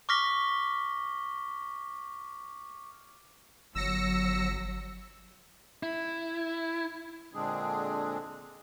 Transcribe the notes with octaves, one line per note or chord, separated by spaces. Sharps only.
C#6 D6 F6 A#6 B6 G7
G1 F#3 E6 A#6 C#7
E4
A#2 D3 G#3 C4 D4 G#4